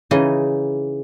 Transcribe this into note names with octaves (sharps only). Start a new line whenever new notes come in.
C#3 E3 D#4 D#5